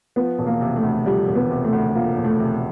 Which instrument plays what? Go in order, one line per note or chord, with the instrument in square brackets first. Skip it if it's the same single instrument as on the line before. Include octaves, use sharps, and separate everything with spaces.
[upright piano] F3 [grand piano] B3
[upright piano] E1
[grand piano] A#3
[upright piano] C3
[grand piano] A3
[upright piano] D2
[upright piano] F3 [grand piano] G3
[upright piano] E1
[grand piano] B3
[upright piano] C3
[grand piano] A3
[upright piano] D2
[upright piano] F3 [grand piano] A#3
[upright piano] E1
[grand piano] A3
[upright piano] C3